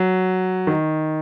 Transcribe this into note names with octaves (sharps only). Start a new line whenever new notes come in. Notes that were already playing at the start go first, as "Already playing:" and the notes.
Already playing: F#3
D#3